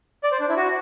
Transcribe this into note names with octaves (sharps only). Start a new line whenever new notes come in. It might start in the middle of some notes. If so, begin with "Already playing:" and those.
D5
C5
D4
E4
F#4